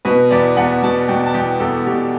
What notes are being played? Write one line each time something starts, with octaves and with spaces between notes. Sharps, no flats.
B2 B4
E2 D5
E2 F#5
B2 A5
B2 G5
A5
E2 G5
E2 A4
B2 G4